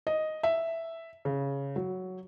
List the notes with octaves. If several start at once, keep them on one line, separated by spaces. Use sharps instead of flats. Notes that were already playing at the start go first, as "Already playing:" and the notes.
D#5
E5
C#3
F#3